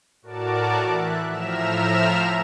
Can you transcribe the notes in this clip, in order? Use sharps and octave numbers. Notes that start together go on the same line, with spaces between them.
A2 F#4 A#4 D5 A5 D6
E3 E5 F#6
A2 F3 E5 A#5 F6 E7